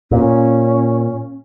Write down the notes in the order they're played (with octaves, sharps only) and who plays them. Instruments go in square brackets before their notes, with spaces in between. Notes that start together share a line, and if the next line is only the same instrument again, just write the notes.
[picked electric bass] A#2 [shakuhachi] C#4